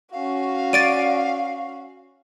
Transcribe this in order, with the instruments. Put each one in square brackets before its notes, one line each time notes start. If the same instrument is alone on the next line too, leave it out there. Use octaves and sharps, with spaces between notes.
[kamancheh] C#4 F#4 [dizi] F5
[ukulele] D5 [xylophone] A6 D7 D#7